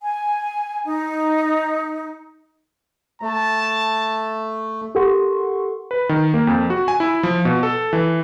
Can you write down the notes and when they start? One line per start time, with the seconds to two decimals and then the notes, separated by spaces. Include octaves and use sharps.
0.01 G#5
0.84 D#4
3.22 A3 A5
4.95 G4 A4 A#4 F#5 C6 C#6
5.91 B4
6.09 D#3
6.34 A#3
6.47 F2
6.70 F#4
6.88 G#5
7.00 E4
7.23 F3
7.45 B2
7.63 A4
7.93 E3